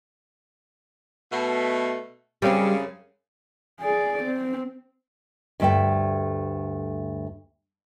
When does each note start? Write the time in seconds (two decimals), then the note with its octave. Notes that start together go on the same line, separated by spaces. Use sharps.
1.31 B2 A3
2.42 F#2 C#3 G3 C4
3.81 G#4 D5
4.23 C4
5.60 D2 G2 A3 E5 G5